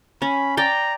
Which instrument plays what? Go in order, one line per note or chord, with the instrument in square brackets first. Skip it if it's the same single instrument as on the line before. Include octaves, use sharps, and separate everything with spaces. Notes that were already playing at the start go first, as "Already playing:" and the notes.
[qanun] C#4 [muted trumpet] B5
[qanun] D5 G5 [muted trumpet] A#5